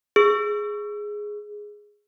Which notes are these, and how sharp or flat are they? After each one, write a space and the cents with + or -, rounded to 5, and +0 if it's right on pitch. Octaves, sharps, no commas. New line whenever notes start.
G#4 +0 E6 +30